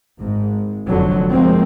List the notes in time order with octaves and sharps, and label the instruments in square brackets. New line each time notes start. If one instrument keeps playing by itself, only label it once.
[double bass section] G#1 G#2
F1 F2 D3 F#3
F3 G#3 A#3 C4